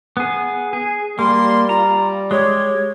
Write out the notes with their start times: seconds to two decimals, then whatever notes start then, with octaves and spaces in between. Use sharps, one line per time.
0.17 B3 G#4
0.73 G#4
1.19 G3 A#3 C6
1.69 F4 A#5
2.31 G#3 G4 C#5